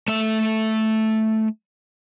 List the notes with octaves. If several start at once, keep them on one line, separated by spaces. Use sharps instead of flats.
A3 E5